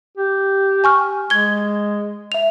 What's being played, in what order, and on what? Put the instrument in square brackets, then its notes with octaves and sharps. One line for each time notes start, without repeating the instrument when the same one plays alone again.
[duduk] G4
[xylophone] G#5 C#6 F6
[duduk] G#3 [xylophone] G#6 G7
[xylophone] E5 F7